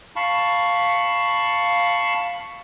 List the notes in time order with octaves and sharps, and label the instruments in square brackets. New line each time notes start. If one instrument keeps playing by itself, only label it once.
[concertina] F5 A5 B5 C#6